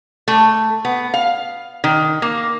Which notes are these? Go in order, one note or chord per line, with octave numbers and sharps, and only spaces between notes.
A3
B3
F5
D#3
A#3